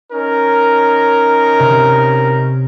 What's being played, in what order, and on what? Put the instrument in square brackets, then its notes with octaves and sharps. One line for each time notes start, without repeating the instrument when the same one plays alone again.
[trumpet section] C#4 D#4 A#4
[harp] C3